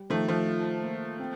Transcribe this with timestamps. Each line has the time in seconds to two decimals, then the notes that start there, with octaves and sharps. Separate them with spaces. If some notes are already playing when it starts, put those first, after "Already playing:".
Already playing: G3
0.10 D#3 F3 A3
0.28 F3 A3
0.47 F4
0.82 A#3
1.19 C4